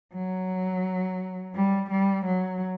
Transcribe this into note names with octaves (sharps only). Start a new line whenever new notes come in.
F#3
G3
G3
F#3